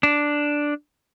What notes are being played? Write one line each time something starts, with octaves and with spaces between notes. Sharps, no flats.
D4